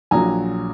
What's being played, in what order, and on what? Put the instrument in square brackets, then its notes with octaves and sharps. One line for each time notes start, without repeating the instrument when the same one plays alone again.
[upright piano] A#1 A#2 F#3 G#5 A#5